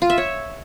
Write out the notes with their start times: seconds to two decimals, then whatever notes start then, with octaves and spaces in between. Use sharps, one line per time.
0.02 F4
0.10 E5
0.18 C#5